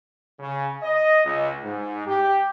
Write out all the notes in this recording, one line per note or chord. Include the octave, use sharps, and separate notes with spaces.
C#3
D#5
C#2
G#2
G4